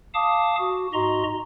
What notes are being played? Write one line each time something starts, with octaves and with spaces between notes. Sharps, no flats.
F5 A5 D6 D#6
F#4
G#2 F#4 D#5 A#5 C6